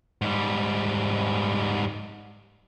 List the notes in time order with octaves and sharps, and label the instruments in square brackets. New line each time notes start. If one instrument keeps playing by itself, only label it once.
[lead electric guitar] G#2 G3